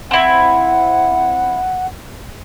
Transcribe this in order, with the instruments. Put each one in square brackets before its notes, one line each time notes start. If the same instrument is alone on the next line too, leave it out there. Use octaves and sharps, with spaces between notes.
[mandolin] C4 E4 [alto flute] F#5